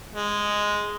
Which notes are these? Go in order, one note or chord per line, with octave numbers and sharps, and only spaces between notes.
G#3